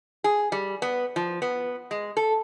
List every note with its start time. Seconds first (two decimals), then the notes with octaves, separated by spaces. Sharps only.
0.24 G#4
0.52 G3
0.82 B3
1.16 F3
1.42 B3
1.91 G#3
2.17 A4